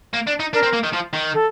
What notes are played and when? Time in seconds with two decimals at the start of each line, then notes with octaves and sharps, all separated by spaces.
0.13 A#3
0.27 D4
0.40 D#4
0.53 D4 A#4
0.63 C4
0.73 A#3
0.84 D#3
0.93 F3
1.13 D#3
1.34 A4